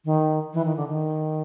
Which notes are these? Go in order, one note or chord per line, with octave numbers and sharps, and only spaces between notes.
D#3
E3
D#3
D3
D#3